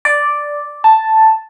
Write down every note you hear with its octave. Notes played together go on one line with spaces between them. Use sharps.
D5
A5